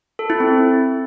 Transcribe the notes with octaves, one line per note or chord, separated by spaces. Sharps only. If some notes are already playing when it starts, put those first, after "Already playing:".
A4
E4
C4